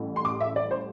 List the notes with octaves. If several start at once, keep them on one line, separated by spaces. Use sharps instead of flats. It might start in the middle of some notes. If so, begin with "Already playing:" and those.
Already playing: A1 A2 G3
C6
D6
E5
D5
C5